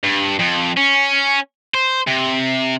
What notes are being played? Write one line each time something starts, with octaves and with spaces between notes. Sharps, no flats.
G2
F2
C#4
C5
C3